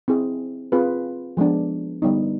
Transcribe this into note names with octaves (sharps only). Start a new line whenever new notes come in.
C4 E4 G#4
C4 F4 G#4 B4
F3 G#3 B3 D4
D3 G3 B3 D#4